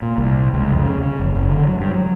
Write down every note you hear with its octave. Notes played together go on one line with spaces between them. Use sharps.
A#2
C2
C#2
F2
C#3
C#3
F#1
F#1
D3
F#3
G2
F#3